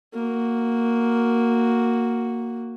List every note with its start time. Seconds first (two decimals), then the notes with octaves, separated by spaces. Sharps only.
0.14 A#3 F#4